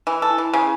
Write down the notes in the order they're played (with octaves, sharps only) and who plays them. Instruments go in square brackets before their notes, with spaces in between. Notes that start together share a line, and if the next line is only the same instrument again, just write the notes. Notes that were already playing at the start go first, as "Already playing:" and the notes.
[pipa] E3
A4
[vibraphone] E4
[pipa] E3
C#3